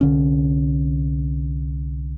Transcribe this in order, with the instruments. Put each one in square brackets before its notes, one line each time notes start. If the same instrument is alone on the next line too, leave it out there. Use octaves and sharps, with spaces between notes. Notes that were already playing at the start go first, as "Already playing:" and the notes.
[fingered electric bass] C2 D3 C#4